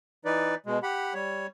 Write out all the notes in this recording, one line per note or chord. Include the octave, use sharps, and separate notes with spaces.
E3 D#4 B4 D5
B2 G#3
G4 F#5 B5
G3 C#5